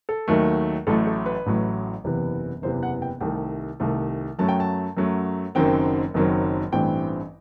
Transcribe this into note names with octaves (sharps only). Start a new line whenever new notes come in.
A4
D#2 D#3 F#3 A3
A1 A2 F#3 A3 A4
A4
B4
A1 A2 F#3 A3
F#1 E2 C3 E3 B3
F#1 E2 C3 E3 B3 C5
F#5
G5
C2 C3 D#3 A3 G5
C2 C3 D#3 A3
F#2 F#3 A3 A5
G5
A5
F#2 F#3 A3
F#1 F#2 D#3 F#3 C4 G5
F#1 F#2 D#3 F#3 C4
A1 G2 E3 A3 C4 G5